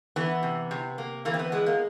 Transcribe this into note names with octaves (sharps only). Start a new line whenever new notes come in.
E3 B3
C3
C3
A#3
E3 A#3
C4
B3
G#3 B3
A#3